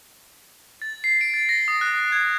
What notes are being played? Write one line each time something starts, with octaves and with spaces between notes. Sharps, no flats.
A6
C7
D7
A6
A#6
D#6
F#6
G#6